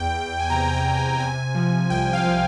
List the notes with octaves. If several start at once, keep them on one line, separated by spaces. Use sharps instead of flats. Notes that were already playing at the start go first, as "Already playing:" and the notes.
Already playing: E2 G5
E2
G#5
C3 A#5
G5
E2
G#5
C3 G#5
F3
C2 G5
F5
F3